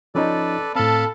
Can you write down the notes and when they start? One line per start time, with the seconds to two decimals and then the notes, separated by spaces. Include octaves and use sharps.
0.15 F3 C#4 D#4 A4 B4 D5
0.75 A2 C4 A4 F5 A5 B5